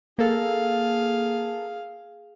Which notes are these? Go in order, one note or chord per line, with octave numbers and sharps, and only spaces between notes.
A#3 G#4 A4 F5